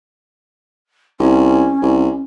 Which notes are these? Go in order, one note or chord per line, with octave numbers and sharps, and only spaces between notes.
C2 C#4
C2